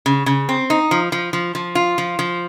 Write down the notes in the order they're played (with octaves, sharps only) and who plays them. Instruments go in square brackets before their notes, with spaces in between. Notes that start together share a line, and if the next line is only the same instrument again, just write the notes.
[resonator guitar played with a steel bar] C#3
C#3
C4
D#4
F3
F3
F3
F3
F4
F3
F3